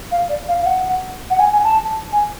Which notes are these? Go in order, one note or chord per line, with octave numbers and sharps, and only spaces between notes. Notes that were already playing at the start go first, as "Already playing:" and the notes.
F5
D5
F5
F5
F#5
F#5
G#5
G#5
A5
G#5